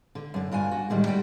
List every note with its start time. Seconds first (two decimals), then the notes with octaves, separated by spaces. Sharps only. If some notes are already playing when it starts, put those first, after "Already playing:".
0.15 D3
0.34 F#2 D3
0.51 G2 D4 F4 G#5
0.71 F#4
0.90 A2 D3 D#3 G3 G#3
1.06 G3 F#4 G5